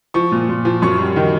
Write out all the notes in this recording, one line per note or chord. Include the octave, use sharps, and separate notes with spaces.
F3 C#6
A#2
A#2
F3
F#2 C#6
G3
D#3